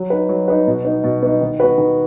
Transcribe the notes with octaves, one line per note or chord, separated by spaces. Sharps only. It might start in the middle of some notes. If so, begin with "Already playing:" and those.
Already playing: F#3
D#4 B4
F#3
D#4 B4
B2
B3 D#4
B2
B3 D#4
D#3
B3 F#4 B4
D#3